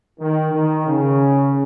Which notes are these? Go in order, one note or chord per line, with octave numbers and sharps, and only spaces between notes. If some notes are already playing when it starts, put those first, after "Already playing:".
D#3
D#3
C#3